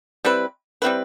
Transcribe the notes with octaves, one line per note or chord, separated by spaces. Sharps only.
G3 C4 E4 B4
G3 C4 E4 B4